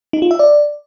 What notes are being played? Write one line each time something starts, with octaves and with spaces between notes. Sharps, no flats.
D#4
F4
E5
D5